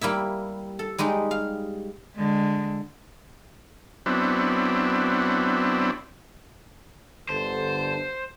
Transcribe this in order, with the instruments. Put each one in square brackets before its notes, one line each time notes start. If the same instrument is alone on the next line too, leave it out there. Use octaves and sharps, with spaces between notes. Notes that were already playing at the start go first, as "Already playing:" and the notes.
[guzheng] G3 A#3 E4 E5
A4
G3 G#3 D#4 G4
F5
[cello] D3 G#3
[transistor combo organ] F#3 B3 C4 D4 E4
[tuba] G1 [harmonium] D3 A5 [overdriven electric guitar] C5